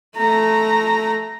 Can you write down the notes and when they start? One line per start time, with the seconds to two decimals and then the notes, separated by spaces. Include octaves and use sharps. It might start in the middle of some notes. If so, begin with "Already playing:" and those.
0.18 A3 A#5